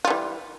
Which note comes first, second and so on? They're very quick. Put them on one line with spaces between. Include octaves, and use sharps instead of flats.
F4 G3 E3